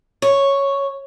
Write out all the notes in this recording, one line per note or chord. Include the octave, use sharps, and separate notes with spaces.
C#5